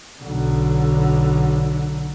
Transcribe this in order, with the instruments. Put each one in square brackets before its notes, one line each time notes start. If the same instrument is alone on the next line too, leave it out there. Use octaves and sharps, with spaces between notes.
[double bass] B1 D3